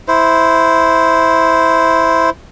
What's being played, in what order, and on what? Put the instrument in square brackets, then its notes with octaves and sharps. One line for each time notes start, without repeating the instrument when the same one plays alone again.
[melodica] E4 C5